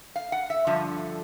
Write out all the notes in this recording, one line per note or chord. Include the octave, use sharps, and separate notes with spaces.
F5
F#5
E5
G2 D3 F3